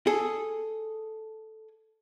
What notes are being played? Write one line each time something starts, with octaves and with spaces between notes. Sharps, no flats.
G#4 A4